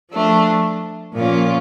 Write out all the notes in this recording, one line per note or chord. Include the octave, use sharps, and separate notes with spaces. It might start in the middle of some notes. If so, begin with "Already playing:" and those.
F3 A3 D4
A#2 F3 A#3 C#4 F4